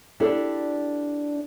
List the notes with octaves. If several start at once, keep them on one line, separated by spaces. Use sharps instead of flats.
D4 E4 G4 A4 D5